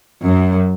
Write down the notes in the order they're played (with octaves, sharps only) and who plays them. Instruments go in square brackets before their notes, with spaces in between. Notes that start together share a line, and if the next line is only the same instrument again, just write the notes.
[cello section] F#2